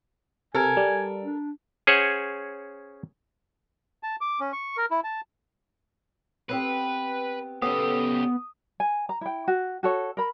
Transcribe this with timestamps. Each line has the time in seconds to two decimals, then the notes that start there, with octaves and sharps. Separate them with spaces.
0.55 C3 A4 A#4 G#5
0.77 G3
1.23 D4
1.87 C#4 G#4 C5 C#5 F#5
4.03 A5
4.21 D6
4.40 C#4
4.53 C#6
4.77 A#4
4.91 E4
5.04 A5
6.49 B3 C4 G4 B4
7.62 C#2 B3 C#4 G4 A4 C5 D#6
8.80 G#5
9.09 A#5
9.21 E4 G5
9.48 F#4
9.83 F#4 A4 C#5
10.17 A#4 B5